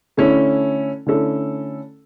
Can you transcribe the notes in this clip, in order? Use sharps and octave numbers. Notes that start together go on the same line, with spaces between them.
D3 A3 C#4 E4 A4
D3 A3 C#4 E4 A4